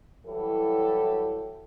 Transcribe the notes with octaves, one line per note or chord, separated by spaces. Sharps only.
E3 F#3 G3 E4 G4 A4